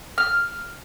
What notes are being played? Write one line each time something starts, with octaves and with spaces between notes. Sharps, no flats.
F6